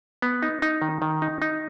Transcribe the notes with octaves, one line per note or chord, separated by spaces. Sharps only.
B3
D#4
D#4
D#3
D#3
D#4
D#4